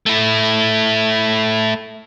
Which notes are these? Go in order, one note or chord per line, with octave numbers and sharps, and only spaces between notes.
A3 E4